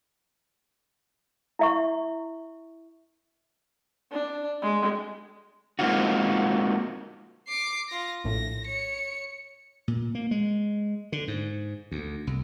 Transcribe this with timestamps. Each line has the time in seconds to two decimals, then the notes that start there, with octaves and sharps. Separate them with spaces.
1.59 E4 E5 C#6
4.12 D4
4.62 G#3
5.79 G#3 A#3 C4 D#4 F4 F#4
7.48 D6 C7
7.88 F4 A#6
8.24 A#1 A2 A#6
8.65 C#5 C#7
9.88 A#2
10.15 A#3
10.31 G#3
11.12 D3
11.28 G#2
11.91 D2
12.27 C2